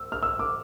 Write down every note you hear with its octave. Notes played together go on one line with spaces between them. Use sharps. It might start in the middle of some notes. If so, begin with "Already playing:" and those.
Already playing: E6
F6
E6
D6